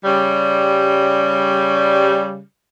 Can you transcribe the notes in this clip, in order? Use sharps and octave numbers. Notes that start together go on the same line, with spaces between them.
C#3 G3